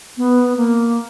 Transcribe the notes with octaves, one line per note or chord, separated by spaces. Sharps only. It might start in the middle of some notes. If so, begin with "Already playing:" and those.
B3
A#3